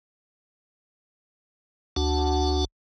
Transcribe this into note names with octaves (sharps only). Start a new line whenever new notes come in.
D2 D4 F#4 F#5 A5